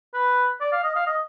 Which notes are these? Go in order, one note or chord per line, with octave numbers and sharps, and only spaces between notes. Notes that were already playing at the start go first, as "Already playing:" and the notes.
B4
D5
F5
D#5
F5
D#5